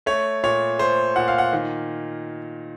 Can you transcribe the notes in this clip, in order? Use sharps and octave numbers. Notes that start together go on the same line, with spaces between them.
A3 C#5
A#2 C#5
A3 C5
A#2 F#5
F5
F#5
D#3